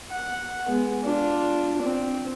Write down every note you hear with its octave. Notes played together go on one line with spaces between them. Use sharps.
F#5
G#3 B3
D4 F4
C4